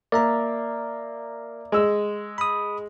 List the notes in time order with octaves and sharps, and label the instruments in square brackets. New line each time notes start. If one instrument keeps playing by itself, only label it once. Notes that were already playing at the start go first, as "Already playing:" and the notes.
[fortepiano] A#3 [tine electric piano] D5 E5 A#5
[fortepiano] G#3 E6
[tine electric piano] B5 D#6